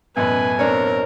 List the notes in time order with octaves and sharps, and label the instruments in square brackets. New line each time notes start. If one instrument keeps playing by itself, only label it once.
[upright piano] A1 F#2 B2 [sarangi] B4 [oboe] G#5
[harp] C4 D4 C#5 [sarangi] A#4